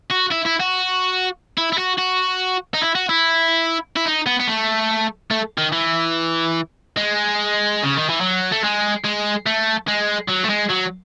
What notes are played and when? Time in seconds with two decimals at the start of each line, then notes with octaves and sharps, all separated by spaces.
0.11 F#4
0.32 E4
0.46 E4
0.60 F#4
1.58 E4
1.72 E4
1.78 F#4
1.98 F#4
2.74 D#4
2.82 E4
2.95 F#4
3.09 E4
3.96 E4
4.06 D#4
4.26 B3
4.40 B3
4.47 A3
5.31 A3
5.58 D#3
5.72 E3
6.97 G#3
7.84 C#3
7.97 D#3
8.10 E3
8.21 F#3
8.52 A3
8.64 G#3
9.04 G#3
9.46 A3
9.88 G#3
10.29 F#3
10.44 A3
10.50 G#3
10.70 F#3